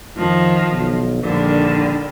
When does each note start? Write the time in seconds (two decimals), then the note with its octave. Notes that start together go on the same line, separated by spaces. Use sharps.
0.17 F2 D#3 F3
0.72 B1
1.24 A#1 D3 D#3 G3